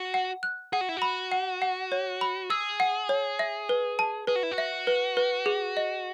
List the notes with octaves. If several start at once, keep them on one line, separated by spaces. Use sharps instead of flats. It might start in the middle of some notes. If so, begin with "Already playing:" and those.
Already playing: F#4
F#5
F#6
G#4 F#5
F#4
E4
F#4 B5
F#5
F#5
C#5
B5
G#4 E6
F#5
C#5
E5
B4
A5
G#4 B4
F#4
E4
F#4
E5
B4
B4
G#4
D#5